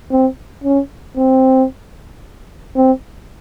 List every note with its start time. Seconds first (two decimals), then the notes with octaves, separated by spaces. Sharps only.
0.11 C4
0.64 C#4
1.17 C4
2.76 C4